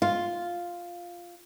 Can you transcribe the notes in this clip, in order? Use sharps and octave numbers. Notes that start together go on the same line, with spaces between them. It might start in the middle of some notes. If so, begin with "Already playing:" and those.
F4